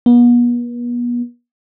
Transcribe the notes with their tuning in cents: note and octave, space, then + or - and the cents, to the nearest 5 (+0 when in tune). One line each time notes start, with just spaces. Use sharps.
B3 -40